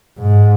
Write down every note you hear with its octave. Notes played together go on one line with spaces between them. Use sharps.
G#2